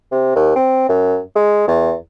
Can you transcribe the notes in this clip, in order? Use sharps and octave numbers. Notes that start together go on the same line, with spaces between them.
C3
D#2
C4
F#2
G#3
E2